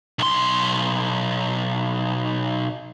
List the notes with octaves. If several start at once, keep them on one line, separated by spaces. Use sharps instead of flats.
B1 C6